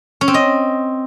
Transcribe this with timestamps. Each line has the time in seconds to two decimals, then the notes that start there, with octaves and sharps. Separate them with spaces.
0.21 C#4
0.28 C4
0.34 D#5